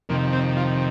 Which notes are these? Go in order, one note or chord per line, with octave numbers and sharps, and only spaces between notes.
F2 C3 D#3 A#3
C4
F4